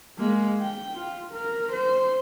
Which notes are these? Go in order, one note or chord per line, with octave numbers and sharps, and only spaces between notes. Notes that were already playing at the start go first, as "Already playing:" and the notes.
G#3 A#3
G5
F4
A#4
C5